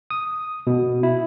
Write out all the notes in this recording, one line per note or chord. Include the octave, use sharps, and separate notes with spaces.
D#6
B2
E4